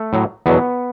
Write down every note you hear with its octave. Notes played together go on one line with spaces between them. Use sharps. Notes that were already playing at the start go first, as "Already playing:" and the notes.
Already playing: A3
A2 F#3
E2 B2 F#3 B3